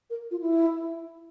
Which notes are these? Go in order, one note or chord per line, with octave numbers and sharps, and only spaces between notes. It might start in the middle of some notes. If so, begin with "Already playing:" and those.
A#4
F4
E4